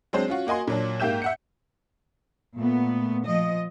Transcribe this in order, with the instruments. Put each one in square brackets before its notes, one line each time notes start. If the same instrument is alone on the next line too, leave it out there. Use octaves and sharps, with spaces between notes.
[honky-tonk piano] F#3 G#3 C4 D4 C5
C#4 F4 F#4
A#3 F#4 D#5 G#5 C6
A#2 F#3 D4
G#2 A#3 G4 E5 G6 E7
E5 F#5 C#7
[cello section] A#2 A3 B3
F3 D#5